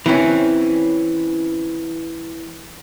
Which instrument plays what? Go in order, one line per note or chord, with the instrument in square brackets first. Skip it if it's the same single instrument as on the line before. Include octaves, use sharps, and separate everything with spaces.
[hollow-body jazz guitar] E3 C4 C#4